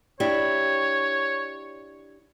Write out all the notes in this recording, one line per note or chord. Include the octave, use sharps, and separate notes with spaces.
D4 E4 G4 C#5